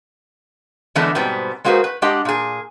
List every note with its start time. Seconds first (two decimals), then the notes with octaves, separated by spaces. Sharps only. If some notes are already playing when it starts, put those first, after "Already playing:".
0.95 D3 E3 G#3 A3 B3 D4
1.15 G#2 B2 G3 B3 C4
1.64 G#3 A#3 F#4 G#4 B4 C5
1.84 B4
2.02 G#3 D4 G4 D#5 F#5
2.25 A#2 G#4